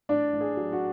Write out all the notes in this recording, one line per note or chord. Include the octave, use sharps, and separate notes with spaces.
A1 D4 D5
A1
G#4
F#3
F#4